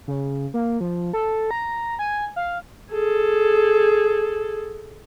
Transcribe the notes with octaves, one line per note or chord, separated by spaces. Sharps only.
C#3
A#3
F3
A4
A#5
G#5
F5
G#4 A4